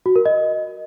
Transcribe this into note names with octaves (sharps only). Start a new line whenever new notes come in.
F#4
A#4
D#5